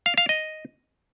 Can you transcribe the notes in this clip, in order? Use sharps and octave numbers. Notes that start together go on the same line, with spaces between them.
F5
F5
D#5